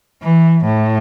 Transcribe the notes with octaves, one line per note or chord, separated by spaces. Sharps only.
E3
A2